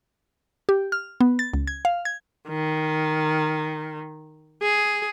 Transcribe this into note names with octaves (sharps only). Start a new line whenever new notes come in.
G4
F6
B3
A6
C#2
G#6
F5
G#6
D#3
G#4